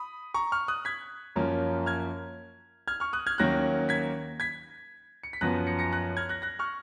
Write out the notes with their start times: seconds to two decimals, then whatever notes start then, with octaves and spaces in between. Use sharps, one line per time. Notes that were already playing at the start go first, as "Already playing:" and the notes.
Already playing: B5 D#6
0.34 A#5 C#6
0.52 C#6 F6
0.68 D#6 F#6
0.85 G#6 B6
1.36 F#2 F3 A#3 C#4
1.86 F6 G#6
2.88 F6 G#6
3.00 C#6 F6
3.13 D#6 F#6
3.27 F6 G#6
3.38 D#2 D#3 F#3 A#3 C#4 F#6 A#6
3.89 G#6 B6
4.40 G#6 B6
5.23 C#7
5.33 B6
5.41 F#2 F3 B3 F#6 A#6
5.67 A#6 C#7
5.79 A#6 C#7
5.93 F#6 A#6
6.17 F6 G#6
6.29 F#6 A#6
6.42 F#6 A#6
6.59 C#6 F6